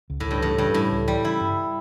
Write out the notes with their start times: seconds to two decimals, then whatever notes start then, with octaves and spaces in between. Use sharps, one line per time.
0.10 C#2
0.20 C#2 A2
0.31 G2
0.42 A2 E3
0.58 G2 C#3
0.74 A2 G3
0.91 C#2
1.08 E3 G3
1.24 C#3 E4
1.40 G2